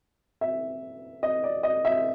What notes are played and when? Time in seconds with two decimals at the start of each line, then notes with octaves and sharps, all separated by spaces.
0.41 E5
1.23 D#5
1.44 D5
1.63 D#5
1.85 E5